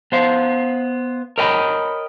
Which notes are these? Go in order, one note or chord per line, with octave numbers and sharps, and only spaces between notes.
B3 C5 F5
A#4 C#5 D#5 G5 B5